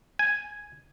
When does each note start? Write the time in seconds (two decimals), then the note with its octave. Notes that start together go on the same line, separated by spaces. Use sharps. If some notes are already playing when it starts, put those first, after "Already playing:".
0.19 G#5